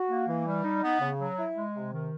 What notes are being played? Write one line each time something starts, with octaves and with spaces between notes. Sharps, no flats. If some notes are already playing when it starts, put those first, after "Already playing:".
Already playing: F#4
A#3
E3
G3
D#4
B3
C#3
F#3
E4
G#3
C3
D#3